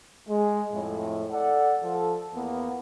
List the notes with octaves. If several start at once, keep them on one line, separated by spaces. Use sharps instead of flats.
G#3
F2 A2
A4 D5 F#5
F3 A4
E2 A#3 B3